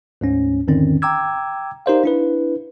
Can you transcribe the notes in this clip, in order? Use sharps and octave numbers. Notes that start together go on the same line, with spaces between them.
D2 G#2 C#4
E2 G#2 D3 D#3 C4 C#4
G5 A#5 D6 E6 G#6
D#4 G4 A#4 C5 D5 F5
D4 E4 B4